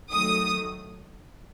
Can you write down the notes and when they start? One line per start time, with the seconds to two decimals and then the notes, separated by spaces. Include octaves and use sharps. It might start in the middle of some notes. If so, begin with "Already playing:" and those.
0.11 D#3 F#3 A3 D#6